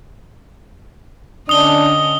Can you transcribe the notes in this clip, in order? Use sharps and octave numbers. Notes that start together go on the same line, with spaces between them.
D3 C#4 D4 D#5 D#6 G7